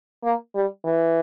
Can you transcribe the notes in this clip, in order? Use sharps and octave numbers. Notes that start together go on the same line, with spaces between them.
A#3
G3
E3